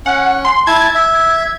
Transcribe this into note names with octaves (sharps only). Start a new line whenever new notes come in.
C#4 F#5
C6
E4 A5 G#6
E5